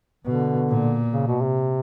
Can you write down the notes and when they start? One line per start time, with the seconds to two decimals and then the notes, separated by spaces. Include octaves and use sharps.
0.25 B2 D3
0.69 A#2
1.12 C#3
1.27 B2
1.42 C3